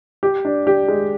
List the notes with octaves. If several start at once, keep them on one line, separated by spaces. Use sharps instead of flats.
G4
D4
G4
G#3